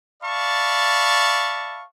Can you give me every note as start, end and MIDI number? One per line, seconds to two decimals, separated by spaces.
0.23 1.83 74
0.23 1.83 76
0.23 1.83 77
0.23 1.83 81
0.23 1.83 83
0.23 1.83 85